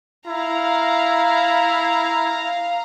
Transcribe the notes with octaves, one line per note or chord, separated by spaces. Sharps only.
E4 F5 A#5